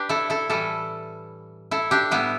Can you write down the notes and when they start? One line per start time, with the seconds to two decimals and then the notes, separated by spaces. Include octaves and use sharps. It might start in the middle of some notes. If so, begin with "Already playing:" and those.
Already playing: D4 G4 B4
0.09 E4 A4
0.30 E4 A4
0.50 A2 E3 G3 E4 A4
1.71 E4 A4
1.91 D4 G4
2.11 A2 G3 B3 E4